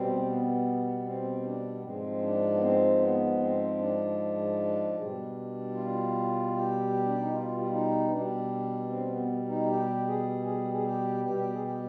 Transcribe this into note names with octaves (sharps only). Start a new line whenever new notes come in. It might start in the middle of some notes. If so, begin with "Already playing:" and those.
Already playing: B2 G3 C4
B3
C4
D4
B3
G#2 F3 G#3 C4
D4
B3
C4
B3
C4
D4
B2 G3
F4
G4
D4
D#4
F4
F4
D#4
B2 G3 D4
C4
B3
D#4
G4
G#4
G#4
G#4
G4
B2 G3 G4
G#4
G4